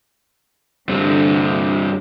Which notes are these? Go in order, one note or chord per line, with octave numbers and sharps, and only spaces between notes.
G2 D3 C4